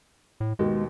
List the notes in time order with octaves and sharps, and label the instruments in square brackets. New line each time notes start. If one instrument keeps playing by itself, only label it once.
[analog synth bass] A2
[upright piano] D#2 B2 [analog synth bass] G#3